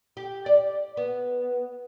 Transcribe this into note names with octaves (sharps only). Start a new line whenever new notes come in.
G4
D5
B3